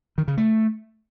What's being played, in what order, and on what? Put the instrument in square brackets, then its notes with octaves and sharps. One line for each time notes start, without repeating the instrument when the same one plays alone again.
[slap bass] D#3
C#3
A3